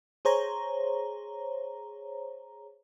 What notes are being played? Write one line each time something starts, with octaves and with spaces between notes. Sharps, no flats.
G#4 C5 C#5 A#5